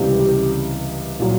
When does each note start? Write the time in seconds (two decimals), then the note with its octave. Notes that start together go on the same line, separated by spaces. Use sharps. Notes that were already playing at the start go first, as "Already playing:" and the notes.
Already playing: C#2 C3 E3 G3 G4
0.20 G4
1.20 A#2 F#3